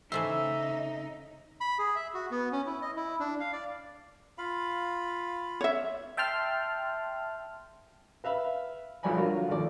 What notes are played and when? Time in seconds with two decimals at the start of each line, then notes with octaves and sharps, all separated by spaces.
0.12 C#3 E3 A3 D#4 C5 E5
1.61 B5
1.79 G#4
1.96 E5
2.14 F#4
2.31 B3
2.52 C#4
2.66 E4
2.82 D#5
2.96 E4
3.19 D4
3.40 F5
3.53 D5
4.38 F4 F5 B5
5.61 C#5 E5
6.17 E5 G5 A5 C6 F6
8.24 B4 E5 F5 B5
9.03 B1 F3 F#3 D5 G#5 B5
9.17 D3 F#3 F4 F#4 A#4
9.49 D#2 F3 A3 D5 D6